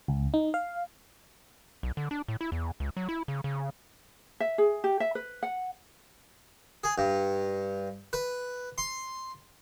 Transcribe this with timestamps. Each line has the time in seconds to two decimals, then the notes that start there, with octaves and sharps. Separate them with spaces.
0.08 C#2
0.34 D#4
0.54 F5
1.83 B1
1.97 D3
2.11 D4
2.28 A2
2.41 E4
2.52 E2
2.80 C#2
2.97 F#3
3.09 E4
3.28 C#3
3.44 C#3
4.40 E5
4.58 G#4
4.84 G4
5.00 E5
5.15 B4
5.43 F#5
6.84 G#4
6.98 G2
8.13 B4
8.78 C6